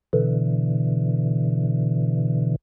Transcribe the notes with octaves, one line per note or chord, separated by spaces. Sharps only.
B2 D3 E3